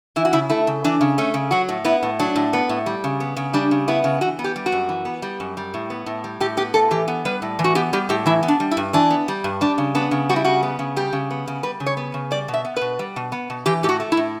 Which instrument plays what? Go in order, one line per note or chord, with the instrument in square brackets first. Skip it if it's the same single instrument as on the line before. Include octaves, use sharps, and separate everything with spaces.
[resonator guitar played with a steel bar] E3 E4
F#4
C#3 E4
A3 E4
C#3
E3 D4
C#3
A3 C#4
C#3
F#3 F#4
A2
B3 E4
A2
F#3 D4
A2
B3
A2
G3
C#3
B3
C#3
G3 D4
C#3
B3 E4
C#3
E3 F#4
B3
G4
G3
F#4
F#2
E3
B3
G3
F#2
G3
A2
B3
A2
G3
A2 G4
B3 G4
A2 A4
E3 G4
B3
G3 B4
A2
E3
F#4
B3 G4
G3 G4
A2 G4
E3 E4
B3
D4
G3
E4
G2
E3 D4
B3
G3
G2
G3 D4
C#3
B3 D4
C#3
G3 F#4
E4
C#3 F#4
B3
C#3
G3 G4
C#3
B3
C#3
G3 B4
C#3
C#5
B3
C#3
G3 D5
B2
E5
B3
B2 B4
G3
B2
B3
B2
E3 G4
A2 G4
F#4
A3
E4
A2